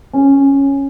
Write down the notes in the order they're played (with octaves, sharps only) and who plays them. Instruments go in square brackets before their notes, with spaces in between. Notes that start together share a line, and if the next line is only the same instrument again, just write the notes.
[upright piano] C#4